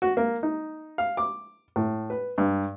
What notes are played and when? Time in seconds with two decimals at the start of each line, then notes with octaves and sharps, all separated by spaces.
0.02 F#4
0.17 A#3
0.43 D#4
0.98 F5
1.17 D6
1.76 A2
2.10 B4
2.38 G2